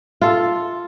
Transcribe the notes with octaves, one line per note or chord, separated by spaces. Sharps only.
F4 A4